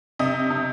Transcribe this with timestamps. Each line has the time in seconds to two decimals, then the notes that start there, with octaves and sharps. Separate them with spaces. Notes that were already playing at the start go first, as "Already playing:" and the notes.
0.19 C3 D#5
0.50 C3